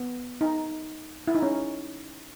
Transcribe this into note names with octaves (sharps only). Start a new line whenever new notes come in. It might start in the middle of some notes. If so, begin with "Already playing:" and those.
Already playing: B3
D#4
E4
D#4
C#4